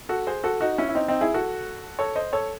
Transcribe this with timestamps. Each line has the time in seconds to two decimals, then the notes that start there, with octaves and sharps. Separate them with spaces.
0.09 F#4 A4
0.27 G#4 C5
0.44 F#4 A4
0.61 D#4 F#4
0.78 C#4 E4
0.89 E4
0.95 C4 D#4
1.08 C4 D#4
1.21 E4 G#4
1.34 F#4 A4
1.99 A4 C#5
2.16 C5 D#5
2.33 A4 C#5